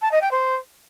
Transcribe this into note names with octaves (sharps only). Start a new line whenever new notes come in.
A5
D#5
G5
C5